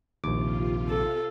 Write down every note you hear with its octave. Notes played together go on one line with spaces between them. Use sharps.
A#1 D#2 C3 F4 D6
A4